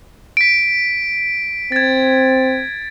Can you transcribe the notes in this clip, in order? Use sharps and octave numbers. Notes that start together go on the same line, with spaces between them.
B6 D7
C4 G#6 A6